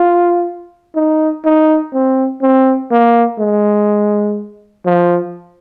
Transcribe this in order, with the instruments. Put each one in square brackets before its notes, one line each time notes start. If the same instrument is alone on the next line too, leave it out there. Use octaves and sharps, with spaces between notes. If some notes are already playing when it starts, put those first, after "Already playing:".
Already playing: [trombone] F4
D#4
D#4
C4
C4
A#3
G#3
F3